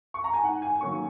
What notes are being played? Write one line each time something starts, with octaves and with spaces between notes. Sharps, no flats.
C#6
A#5
G#5
G#2 F#5
G#5
D#3 F#3 A#3 C#4 C#6